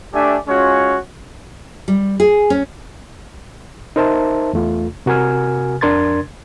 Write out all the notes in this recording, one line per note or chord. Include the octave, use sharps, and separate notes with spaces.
A3 D4 G4 D5 E5 G#5
G#3 C#4 F4 F#4 C#5
G3
G#4
C#4
D#4 A#4 C5 E5 A5
E2 A3 F4
C3 F#4 A#4 G#5 F6
F2 D4 A#4 C6 G#6 A6